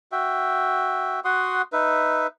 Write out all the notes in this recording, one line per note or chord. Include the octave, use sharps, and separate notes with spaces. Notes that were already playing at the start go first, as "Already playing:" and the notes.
F#4 E5 G5
F#4 F#5 C6 D#6
D#4 B4 E5